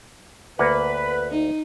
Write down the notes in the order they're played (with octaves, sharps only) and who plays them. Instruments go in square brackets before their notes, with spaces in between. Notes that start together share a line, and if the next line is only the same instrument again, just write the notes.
[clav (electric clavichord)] D2 A#3 F#5 [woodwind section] B4
[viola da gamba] D#4